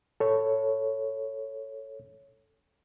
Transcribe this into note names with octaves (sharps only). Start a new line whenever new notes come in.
A4 C#5